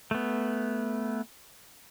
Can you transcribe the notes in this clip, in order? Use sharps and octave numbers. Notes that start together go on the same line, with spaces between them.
A3 B3